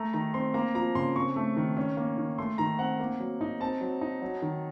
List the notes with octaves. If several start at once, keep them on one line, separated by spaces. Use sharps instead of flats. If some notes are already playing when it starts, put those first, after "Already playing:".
Already playing: A3 A#5
D#3 A#5
C4 C6
A#3 A#5
F3 A#5
C#3 C6
C4 C#6
A3
D#3
C#4
A#3
D#3
A3 C6
D#3 A#5
C4 F#5
A#3
F#3
D#4
C4 A5
F#3
D#4
F#3
D#3